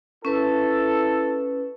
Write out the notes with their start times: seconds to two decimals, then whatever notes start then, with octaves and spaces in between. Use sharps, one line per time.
0.25 C#4 E4 A4 B4